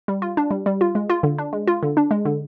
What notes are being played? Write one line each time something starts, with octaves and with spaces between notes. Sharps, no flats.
G3
F4
D4
G3
G3
F4
G#3
F4
D3
D4
G#3
F4
D3
D4
G#3
D3